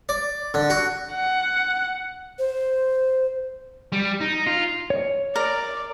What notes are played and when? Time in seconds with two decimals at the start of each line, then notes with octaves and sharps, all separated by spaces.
0.09 D5
0.54 D3
0.70 F#4
1.12 F#5
2.39 C5
3.92 G3
4.21 D#4
4.47 F4
4.90 C#5
5.36 A#4 D5